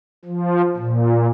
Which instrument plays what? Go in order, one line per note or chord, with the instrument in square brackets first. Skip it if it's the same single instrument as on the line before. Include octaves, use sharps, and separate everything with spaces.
[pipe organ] F3
A#2